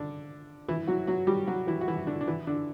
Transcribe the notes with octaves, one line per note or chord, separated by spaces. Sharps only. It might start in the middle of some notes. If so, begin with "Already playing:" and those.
Already playing: D3 D4
E3 E4
F#3 F#4
F#3 F#4
G3 G4
F#3 F#4
E3 E4
F#4
E3 E4
D3 D4
D4
E3 E4
D3 D4